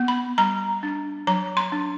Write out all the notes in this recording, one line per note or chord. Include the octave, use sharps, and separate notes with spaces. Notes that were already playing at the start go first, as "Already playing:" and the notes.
Already playing: B3
B5
G3 A#5
D4
F#3 A#5
C6
D4